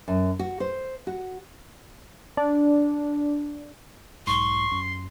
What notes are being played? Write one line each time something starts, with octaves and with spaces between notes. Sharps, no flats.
F#2
F#4
C5
F#4
D4
B1 G#2 C6 C#6
F#2